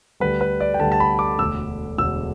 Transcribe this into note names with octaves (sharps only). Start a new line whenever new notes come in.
D2 D3 G3 B4
B4
D5
G5
D2 D3 G3 A5
A5
B5
D6
E1 D2 D3 E6
E1 D2 D3 E6